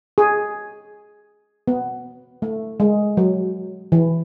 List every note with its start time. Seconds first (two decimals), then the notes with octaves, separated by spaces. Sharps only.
0.18 G#4
1.68 B3
2.42 A3
2.80 G#3
3.17 F#3
3.92 E3